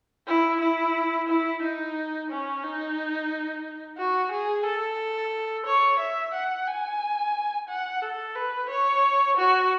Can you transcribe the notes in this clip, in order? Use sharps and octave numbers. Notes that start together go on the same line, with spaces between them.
E4
E4
E4
D#4
C#4
D#4
F#4
G#4
A4
C#5
E5
F#5
G#5
F#5
A4
B4
C#5
F#4